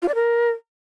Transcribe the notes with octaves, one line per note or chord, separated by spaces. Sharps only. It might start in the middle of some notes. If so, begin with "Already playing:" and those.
F4
D5
A#4